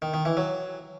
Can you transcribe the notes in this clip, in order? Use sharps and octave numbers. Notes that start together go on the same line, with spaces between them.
D#3
D#3
E3
F#3